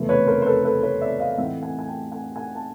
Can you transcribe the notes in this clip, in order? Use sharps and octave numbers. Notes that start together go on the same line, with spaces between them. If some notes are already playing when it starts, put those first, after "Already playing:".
Already playing: F1 E2 C#3 E3 A3
B4 C#5
A#4 C5
C5
A4 B4
A4 B4
B4 C#5
D5 E5
D#5 F5
F5
A2 E3 A3 C4 D#4 E5 F#5
F#5 G#5
G#5
G5 A5
F#5 G#5
F#5 G#5
A5